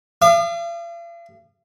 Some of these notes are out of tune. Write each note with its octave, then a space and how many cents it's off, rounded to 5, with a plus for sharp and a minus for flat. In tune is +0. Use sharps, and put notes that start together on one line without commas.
F5 -45 D#6 -45